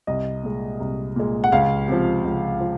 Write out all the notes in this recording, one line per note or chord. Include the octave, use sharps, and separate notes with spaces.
C2 D#5
A#2 G#3
C2
A#2 G#3
F#5
C#2 F5
C3 F3
C#2
F3